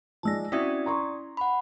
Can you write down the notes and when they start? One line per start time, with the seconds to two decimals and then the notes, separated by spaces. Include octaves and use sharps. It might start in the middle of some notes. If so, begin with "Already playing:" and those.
0.23 F3 G#3 D5 A5 E6 A#6
0.52 C4 C#4 E4 F#4 D5 E5 G5 D#6
0.86 A#5 C6 C#6
1.37 F#5 B5